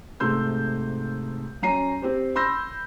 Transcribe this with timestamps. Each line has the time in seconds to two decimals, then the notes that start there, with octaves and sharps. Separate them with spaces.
0.20 G#2 C3 A3 C6 E6 G6
1.62 F#3 C#4 A#5 C7 D#7
2.02 C4 G4 C5
2.36 B5 C6 E6 G6 A#6